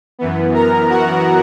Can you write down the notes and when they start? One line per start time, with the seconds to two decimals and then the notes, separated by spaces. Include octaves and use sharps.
0.19 F#2 E3 B3
0.54 A#4 A#5
0.89 F#4 F#5